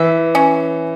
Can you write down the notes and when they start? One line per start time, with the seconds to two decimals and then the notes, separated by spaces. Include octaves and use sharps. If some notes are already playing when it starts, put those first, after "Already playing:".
Already playing: E3 E5
0.35 C#4